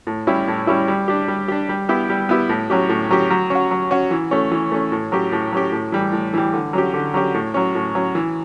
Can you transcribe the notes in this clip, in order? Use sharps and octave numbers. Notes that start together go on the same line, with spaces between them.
A2
G3 C#4 E4
A2
G3 C#4 E4
G3
D4 G4
G3
D4 G4
G3
B3 E4 G4
G3
B3 E4 G4
A2
F#3 C#4 G4
A2
F#3 C#4 G4
F#3
C#4 F#4
F#3
C#4 F#4
E3
A3 C#4
E3
A3 C#4
A2
F#3 C#4 G4
A2
F#3 C#4 G4
A2
E3 G3
A2
E3 G3
D3
F#3 C#4 G4
D3
F#3 C#4 G4
A2
F#3 C#4
A2
F#3 C#4
E3